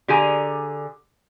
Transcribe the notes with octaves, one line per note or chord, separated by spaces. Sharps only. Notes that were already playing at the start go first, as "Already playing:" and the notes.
D3 G4 G#4 G#5 A#5